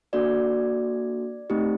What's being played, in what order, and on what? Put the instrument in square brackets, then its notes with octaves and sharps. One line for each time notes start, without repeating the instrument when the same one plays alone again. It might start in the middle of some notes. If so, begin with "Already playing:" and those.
[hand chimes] A#3 D4 F#4 A4 D5
A3 C4 D#4 G4